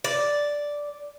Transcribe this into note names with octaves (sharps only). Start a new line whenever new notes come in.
D5